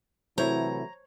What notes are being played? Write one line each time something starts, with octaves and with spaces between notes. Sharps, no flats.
C3 E3 F#3 A3 E4 C5 C#5 A#5